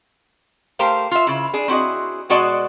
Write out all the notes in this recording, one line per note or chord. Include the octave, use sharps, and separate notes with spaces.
A3 G4 A#4 C5 F5
F4 E5
C#3 E4
D4 G#4
C4 E4 F#4 G#4 D#5
B2 G#3 F#4 D5 D#5 A5